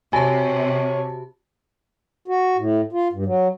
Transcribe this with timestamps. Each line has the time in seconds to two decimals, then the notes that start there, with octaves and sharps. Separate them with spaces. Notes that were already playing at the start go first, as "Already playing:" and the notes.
0.13 C3 F#4 G4 C#5 G#5 A5
2.28 F#4
2.58 A2
2.93 F4
3.13 G2
3.26 F#3